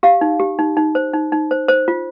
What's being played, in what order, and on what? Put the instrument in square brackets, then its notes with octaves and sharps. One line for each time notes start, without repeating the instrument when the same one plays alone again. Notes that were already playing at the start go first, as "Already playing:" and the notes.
[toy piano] G4 F5
D#4
G4
D#4
D#4
C5
D#4
D#4
C5
C5
F4